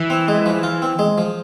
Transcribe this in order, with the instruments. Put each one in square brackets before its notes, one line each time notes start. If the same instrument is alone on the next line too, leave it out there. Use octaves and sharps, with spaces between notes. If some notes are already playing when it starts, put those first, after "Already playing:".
Already playing: [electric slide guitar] E3
[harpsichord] C4
G#3
F3
F4
C4
G#3
F3